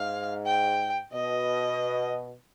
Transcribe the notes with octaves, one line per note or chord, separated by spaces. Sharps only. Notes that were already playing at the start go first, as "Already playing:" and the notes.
Already playing: G#2 F5
G5
B2 D#5